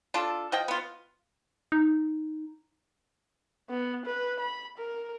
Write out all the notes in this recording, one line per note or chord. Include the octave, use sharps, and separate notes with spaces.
D4 F4 A4
F3 D#5 G5
B3 F4
D#4
B3
B4
B5
A#4